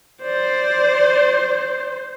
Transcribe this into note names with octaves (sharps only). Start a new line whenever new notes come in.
C5 D5